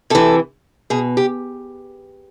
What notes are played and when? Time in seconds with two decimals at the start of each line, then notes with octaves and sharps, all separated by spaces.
0.10 C3 E3 A4
0.90 B2 G#4
1.17 G4